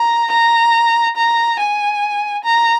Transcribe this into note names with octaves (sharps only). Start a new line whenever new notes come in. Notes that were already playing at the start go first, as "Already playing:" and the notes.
Already playing: A#5
A#5
A#5
G#5
A#5